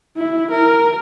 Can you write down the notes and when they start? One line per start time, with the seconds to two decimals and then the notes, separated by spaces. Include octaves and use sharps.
0.17 E4
0.51 A#4